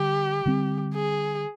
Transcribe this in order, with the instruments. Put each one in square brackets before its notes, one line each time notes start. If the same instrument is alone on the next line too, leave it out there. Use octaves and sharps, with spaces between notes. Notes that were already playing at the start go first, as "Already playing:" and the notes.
Already playing: [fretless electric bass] D3 G3 [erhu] G4
[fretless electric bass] D3 G3 C4
[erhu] G#4